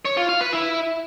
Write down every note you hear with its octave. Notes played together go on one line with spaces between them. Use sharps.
C#5
F4
F5
B4
E4